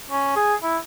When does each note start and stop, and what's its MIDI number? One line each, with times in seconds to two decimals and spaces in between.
0.11 0.34 61
0.36 0.54 68
0.63 0.77 64